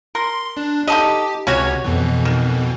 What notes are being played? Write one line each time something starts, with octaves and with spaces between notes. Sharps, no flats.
A#4 C6
D4
D#4 G4 A4 D#5
C#2 C3 C#4 F#4 C#5 G#6
F2 B2 E3
D#3